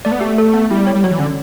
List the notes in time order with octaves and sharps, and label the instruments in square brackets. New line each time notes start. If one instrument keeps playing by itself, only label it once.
[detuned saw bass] A3 [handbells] D5
[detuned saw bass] B3
[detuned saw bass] A3 [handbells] G4
[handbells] A4
B3
[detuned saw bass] G3 [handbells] E4
[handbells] C#5
[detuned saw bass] G3
[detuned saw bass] F#3 [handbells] C#5
[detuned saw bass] E3
[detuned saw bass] D3 [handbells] C#4